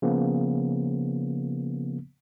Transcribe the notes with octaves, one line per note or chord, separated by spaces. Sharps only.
C#3 F3 A#3 B3